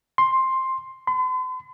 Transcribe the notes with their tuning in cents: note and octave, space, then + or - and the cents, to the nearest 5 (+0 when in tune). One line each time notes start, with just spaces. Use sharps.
C6 +10
C6 -45